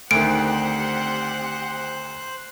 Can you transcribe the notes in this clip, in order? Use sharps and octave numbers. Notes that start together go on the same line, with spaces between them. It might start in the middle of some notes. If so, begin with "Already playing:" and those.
D2 D#3 C4 G4 C5 F#5 F#6 D7